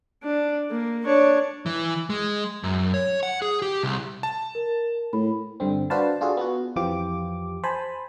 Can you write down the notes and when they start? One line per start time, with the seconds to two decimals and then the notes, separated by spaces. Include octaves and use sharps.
0.23 D4
0.71 A#3
1.05 D4 C#5
1.66 E3
2.10 G#3
2.63 F#2
2.94 C#5
3.23 F#5
3.42 G#4
3.62 G4
3.83 C2
4.23 A5
4.55 A#4
5.13 A2 B5
5.60 G2 D3 C4
5.90 D4 F#4 B4 C5 F5 A5
6.21 D4 F4 F#4 G#4 A4
6.37 B3 F4 F#4
6.76 F2 E3 F3 F4 G4 D6
7.64 C5 G#5 A5 B5